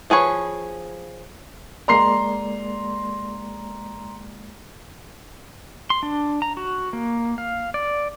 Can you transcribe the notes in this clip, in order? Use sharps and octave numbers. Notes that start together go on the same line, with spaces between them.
F3 G#4 B4 C#5
G#3 A#3 D5 A#5 C6 C7
C6
D4
A#5
F#4
A#3
F5
D5